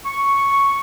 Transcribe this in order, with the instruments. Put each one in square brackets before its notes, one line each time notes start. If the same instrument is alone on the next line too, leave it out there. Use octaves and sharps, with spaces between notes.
[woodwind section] C#6